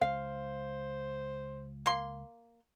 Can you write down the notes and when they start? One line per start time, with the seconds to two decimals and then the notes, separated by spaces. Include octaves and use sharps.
0.01 C#2 C5 F5
1.86 A#3 C6